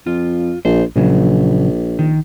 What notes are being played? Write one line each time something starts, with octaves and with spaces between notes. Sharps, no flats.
F2 F4
A#1 C5
A#1 A#2 C#3 F#3
D#3